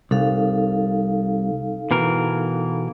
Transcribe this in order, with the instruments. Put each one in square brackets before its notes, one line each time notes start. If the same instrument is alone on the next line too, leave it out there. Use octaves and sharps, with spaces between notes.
[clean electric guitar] C2 [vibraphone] D#4 A4 F5
[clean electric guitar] B2 E3 A#4